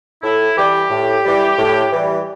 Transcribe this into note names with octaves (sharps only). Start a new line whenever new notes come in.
A2 E4
E3 G3 G4
A2
E3 G3
A2
E3 G3